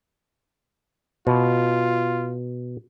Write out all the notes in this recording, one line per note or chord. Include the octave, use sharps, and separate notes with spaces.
B2 F4